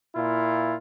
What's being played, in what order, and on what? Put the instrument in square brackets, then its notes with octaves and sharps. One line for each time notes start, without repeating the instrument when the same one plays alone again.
[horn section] A#2 E4 F4